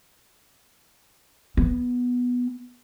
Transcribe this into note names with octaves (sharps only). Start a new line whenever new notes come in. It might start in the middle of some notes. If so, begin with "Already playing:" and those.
B3